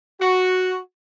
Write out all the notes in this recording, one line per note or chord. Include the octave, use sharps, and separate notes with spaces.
F#4